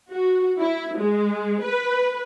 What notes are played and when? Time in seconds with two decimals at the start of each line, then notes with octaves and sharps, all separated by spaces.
0.11 F#4
0.59 E4
0.97 G#3
1.63 B4